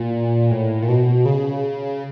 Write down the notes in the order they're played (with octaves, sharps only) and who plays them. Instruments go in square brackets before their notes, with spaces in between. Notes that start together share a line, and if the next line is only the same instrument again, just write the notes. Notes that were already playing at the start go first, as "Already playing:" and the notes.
Already playing: [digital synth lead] A#2
A2
A#2
B2
C#3